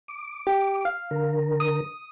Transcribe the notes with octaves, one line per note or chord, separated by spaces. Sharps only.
D6
G4
F5
D3 A#4
D#6